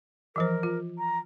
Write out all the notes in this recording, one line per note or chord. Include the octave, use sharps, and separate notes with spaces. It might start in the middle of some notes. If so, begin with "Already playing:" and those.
E3 F3 A#4 C5
F4
A#5